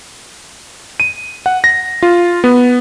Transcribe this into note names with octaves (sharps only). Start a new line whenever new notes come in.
D#7
F#5
A#6
F4
B3